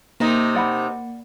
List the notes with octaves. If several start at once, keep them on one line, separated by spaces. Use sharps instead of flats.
C3 A#3 D#4
D5 F#5 B5